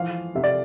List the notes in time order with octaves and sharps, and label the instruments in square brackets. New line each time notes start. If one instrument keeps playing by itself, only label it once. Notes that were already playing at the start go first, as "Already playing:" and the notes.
Already playing: [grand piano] E3 F3 F5
C3 E5
D5